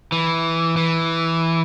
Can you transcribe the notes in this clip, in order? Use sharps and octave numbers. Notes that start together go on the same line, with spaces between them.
E3
E3